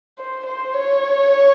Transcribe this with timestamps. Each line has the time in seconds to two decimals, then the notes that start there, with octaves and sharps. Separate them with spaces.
0.18 C5
0.45 C5
0.74 C#5